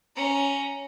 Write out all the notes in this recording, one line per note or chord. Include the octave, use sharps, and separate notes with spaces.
C#4 A#5